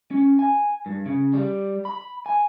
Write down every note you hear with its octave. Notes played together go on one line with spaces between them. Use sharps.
C#4
G#5
G2
C#3
G3
B5
G#5